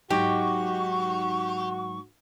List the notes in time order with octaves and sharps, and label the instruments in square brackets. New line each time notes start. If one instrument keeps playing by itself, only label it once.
[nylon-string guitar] G#2 F#3 D#4 [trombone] F#4 [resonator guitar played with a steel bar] G4 [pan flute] C#6